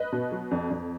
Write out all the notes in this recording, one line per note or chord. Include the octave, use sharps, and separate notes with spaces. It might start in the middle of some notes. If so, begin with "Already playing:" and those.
Already playing: B4 D#5
B2
F#3
F2
F2